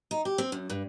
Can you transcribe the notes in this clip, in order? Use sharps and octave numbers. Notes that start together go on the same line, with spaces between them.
D#4
G4
C4
F#2
G2